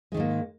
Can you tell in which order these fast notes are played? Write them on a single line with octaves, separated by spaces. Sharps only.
G#3 D#3 G#2 A#3